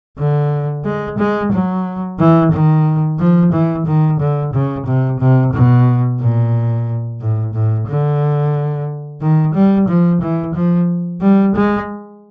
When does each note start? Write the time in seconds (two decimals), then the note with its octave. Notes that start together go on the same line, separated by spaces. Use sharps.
0.18 D3
0.85 G#3
1.18 G#3
1.52 F#3
2.19 E3
2.51 D#3
3.19 F3
3.52 E3
3.86 D#3
4.19 D3
4.53 C#3
4.86 C3
5.20 C3
5.53 B2
6.20 A#2
7.20 A2
7.54 A2
7.87 D3
9.21 D#3
9.54 G3
9.88 F3
10.21 E3
10.54 F3
11.21 G3
11.55 G#3